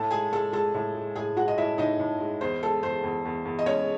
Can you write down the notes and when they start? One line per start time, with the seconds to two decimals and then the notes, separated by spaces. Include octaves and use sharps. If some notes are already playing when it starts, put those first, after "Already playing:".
Already playing: A2 A4 A5
0.11 G#3 G#4 G#5
0.33 G#3 A4 A5
0.52 G#3 A4 A5
0.74 A2
0.95 G#3
1.15 A2 G#4 G#5
1.37 G#3 F#4 F#5
1.48 D#5
1.58 A2 E4 E5
1.78 A2 D#4 D#5
1.99 A2
2.20 G#3
2.41 E2 C5
2.63 G#3 A4
2.83 E2 C5
3.03 E2
3.25 E2
3.45 E2
3.59 D#5
3.66 G#3 C#4 C#5